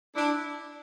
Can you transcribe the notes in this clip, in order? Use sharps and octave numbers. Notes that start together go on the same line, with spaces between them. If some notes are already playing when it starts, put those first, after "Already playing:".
D4 E4